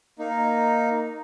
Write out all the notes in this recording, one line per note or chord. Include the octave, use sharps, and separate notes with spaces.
A#3 D#4